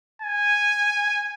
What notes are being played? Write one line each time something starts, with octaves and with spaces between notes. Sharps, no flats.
G#5